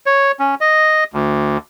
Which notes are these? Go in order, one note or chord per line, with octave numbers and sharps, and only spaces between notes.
C#5
C#4
D#5
D2